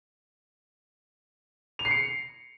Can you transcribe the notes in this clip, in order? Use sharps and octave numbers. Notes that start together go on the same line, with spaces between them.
F7
C7
C#7